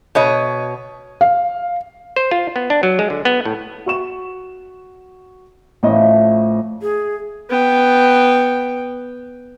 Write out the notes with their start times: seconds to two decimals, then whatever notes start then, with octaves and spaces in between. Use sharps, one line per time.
0.15 B2 C#5 D#5
1.21 F5
2.16 C5
2.31 F4
2.56 B3
2.70 D4
2.83 F#3
2.99 G#3
3.10 D3
3.25 B3
3.45 A2
3.86 F#4 C#6 E7
5.83 A1 A2 F3 A3 D#5
6.82 G#4
7.50 B3 G5